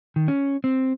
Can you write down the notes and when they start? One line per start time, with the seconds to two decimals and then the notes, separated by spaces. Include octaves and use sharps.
0.16 D#3
0.28 C#4
0.64 C4